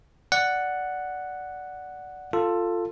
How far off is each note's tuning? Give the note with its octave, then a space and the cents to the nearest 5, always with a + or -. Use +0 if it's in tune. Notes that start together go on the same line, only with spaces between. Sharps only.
D5 +0 F#5 +0
F4 +0 A4 +15